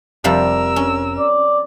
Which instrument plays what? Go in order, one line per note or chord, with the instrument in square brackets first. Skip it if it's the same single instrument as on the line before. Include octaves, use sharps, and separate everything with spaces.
[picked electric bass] F1 [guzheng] C3 F3 G3 [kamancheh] A#4 E6
[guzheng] C#4
[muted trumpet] D5